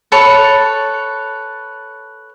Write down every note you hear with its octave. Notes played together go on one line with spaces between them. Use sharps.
A4 B4 C#5 A5